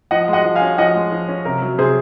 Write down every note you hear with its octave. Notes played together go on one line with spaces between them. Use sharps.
F3 D#5 F#5
G#3
D#5 F#5
F3
F5 G#5
C#4
F3 D#5 F#5
G#3
F3
C#4
C3 A#4
F#3
C3 G#4 C5